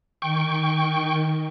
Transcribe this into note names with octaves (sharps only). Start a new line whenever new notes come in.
D#3 G5 C#6